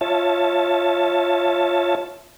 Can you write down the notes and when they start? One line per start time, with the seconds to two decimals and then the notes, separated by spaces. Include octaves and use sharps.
0.01 F4 C#5 E5 A5